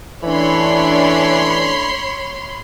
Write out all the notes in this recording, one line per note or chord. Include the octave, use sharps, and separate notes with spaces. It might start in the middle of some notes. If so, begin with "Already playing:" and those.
E3 A3 C#4 D4 C#5 B5 C6